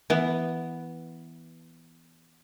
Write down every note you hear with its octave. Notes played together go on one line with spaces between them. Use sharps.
E3 B3